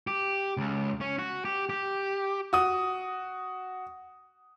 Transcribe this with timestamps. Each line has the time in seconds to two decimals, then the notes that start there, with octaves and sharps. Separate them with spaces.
0.07 G4
0.57 C#2
1.01 C#4
1.19 F#4
1.45 G4
1.69 G4
2.53 F#4 D#6